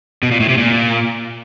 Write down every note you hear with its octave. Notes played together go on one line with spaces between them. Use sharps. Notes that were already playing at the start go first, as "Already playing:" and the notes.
B2
A#2
A2
C3
A#2